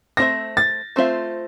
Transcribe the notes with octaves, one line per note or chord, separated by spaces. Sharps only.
A3 C4 F4 C5 E5 A#6
A6
A3 C4 F4 C5 E5